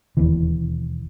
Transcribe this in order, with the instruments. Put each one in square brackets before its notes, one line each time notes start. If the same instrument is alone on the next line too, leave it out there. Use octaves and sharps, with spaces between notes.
[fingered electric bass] E1 D#2 B2 E3